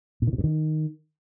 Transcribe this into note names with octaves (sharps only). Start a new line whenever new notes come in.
A#2
D#3
B2
G2
D#3